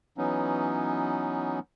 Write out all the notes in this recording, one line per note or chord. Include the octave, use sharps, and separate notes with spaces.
E3 F#3 B3 C#4 D#4